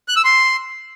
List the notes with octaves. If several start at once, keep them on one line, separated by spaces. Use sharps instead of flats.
F#6
E6
C6